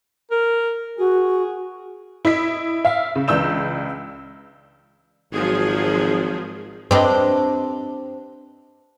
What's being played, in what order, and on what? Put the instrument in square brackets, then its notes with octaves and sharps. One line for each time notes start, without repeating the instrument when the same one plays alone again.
[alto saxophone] A#4
[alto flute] F#4 [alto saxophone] G#4
[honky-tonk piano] E4 D#5 B6
E5 F5
C#3
C#2 E3 D4 E6 G6 E7
[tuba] G#1 [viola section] F3 F#3 G#4
[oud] C4 D4 [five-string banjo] G4 B4 D#5